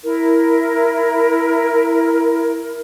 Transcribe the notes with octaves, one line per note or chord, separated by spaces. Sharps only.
E4 A#4